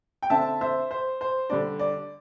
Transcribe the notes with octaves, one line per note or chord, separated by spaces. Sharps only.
G5
D3 C4 E5 A5
C5 E5
C5
C5
D3 G3 D4 D5
D5